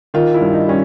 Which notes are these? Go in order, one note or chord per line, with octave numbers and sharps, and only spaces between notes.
D#3 F4
E4
G2
D#4
G3 C#4